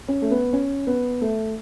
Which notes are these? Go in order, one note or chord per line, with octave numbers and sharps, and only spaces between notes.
C#4
A3
B3
C#4
B3
A3